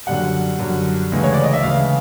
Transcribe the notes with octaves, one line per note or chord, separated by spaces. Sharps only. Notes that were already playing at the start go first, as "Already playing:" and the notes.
F#2 D3 G3 F#5
F#2 D3 G3
D2 C#3 E3 G#3
C#5
D5
D#5
E5
D2 C#3 E3 G#3 F5